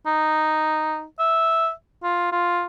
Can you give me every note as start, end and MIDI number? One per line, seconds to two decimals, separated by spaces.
0.06 1.04 63
1.19 1.71 76
2.03 2.30 65
2.32 2.66 65